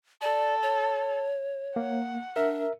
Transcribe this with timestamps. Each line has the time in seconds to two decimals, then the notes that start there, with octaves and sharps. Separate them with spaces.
0.22 A4 D5
0.63 C#5
1.76 A#3 F#5
2.36 D4 A#4 E5